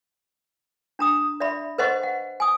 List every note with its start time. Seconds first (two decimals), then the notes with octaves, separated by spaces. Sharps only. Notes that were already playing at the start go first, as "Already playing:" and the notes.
0.99 D4 A#5 D#6
1.40 D5 E5 B5
1.78 B4 C5 D#5 F#5 C#6
2.03 F#5
2.40 G#5 D#6